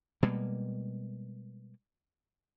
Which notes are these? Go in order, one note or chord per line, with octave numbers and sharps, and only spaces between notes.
B2 G3 G#3 A#3